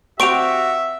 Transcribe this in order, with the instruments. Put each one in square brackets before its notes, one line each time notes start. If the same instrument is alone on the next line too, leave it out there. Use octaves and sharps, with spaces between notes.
[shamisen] C4 G4 [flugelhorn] F#4 [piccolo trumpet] E5 [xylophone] C#6 D7 F7